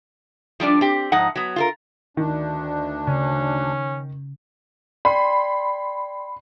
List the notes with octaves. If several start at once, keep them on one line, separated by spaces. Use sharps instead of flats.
F3 G3 D4 D5
C4 G4
G#2 F3 D#4 F#5
F#3 B3
F4 A4 A#4
D2 D#3 D4
C#3 C#4
D5 G5 B5 C6